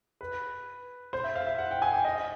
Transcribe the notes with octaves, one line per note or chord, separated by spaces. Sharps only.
B4
C5
E5
F5
E5
F#5
G5
G#5
G5
D#5